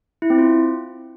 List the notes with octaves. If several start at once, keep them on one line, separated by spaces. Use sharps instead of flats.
E4
C4
F4